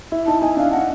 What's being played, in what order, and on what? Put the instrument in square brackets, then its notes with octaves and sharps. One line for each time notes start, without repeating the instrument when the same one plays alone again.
[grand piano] E4
[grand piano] D#4 [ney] A5
[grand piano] D#4 [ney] G#5
[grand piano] D4 [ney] F5
[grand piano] D4 [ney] F#5